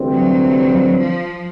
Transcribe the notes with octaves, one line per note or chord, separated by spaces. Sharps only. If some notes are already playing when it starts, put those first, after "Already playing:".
Already playing: D2 C3 E3 G3 C4
F#3
F3